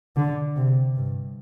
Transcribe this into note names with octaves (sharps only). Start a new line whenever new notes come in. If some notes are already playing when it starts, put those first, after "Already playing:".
D3
C3
G2